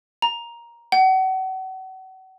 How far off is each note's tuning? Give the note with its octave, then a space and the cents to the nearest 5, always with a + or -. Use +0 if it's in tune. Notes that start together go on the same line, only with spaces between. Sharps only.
A#5 +10
F#5 +35